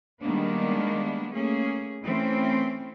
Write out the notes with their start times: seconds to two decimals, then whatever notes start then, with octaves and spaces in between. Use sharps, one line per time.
0.22 D#3 G3 G#3 A#3 B3 D4
1.33 A3 A#3 C#4 G#4
2.04 E3 A3 C4 C#4